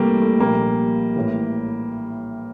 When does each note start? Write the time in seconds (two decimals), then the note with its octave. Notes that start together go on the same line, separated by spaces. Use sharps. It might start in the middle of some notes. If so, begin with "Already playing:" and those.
Already playing: C2 C3 E3 G3 A3 A#3
0.22 A3
0.40 A#1 A#2 G3 A#3
1.16 A1 A2 E3